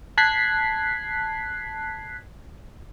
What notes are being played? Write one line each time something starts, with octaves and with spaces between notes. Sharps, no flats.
A5 F#6 G#6 B6 C7